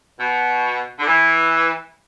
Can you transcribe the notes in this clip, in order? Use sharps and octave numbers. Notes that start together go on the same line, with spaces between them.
B2
D3
E3